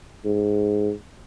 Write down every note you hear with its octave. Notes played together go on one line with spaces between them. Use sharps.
G#2